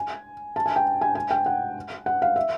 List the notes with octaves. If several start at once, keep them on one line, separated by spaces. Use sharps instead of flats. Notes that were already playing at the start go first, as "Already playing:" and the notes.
Already playing: G#5
A5
G#5
G5
G#5
G#5
G5
F#5
F#5
F5
E5